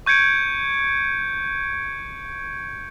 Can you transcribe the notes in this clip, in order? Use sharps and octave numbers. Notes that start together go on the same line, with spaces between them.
C#6 G6 G#6 C#7 D7